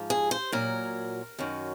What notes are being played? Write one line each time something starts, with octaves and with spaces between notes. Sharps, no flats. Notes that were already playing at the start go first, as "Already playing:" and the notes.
Already playing: G#2 F3
G#4
C5
A#2 F#3 A#4
F#2 D#3 F#3